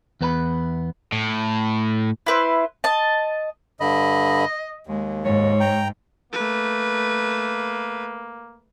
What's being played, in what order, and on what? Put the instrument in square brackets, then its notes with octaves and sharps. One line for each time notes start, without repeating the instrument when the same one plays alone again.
[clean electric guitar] E2 B3 B4 A5 B5
[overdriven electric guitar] A2
[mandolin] E4 B4 C5
D#5 A5
[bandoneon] G2 D3 B5 [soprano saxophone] D#5
[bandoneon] D#2 [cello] G#3
[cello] G#2 [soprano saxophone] C#5
[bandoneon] G5 A#5
[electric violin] A3 B4 [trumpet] A#3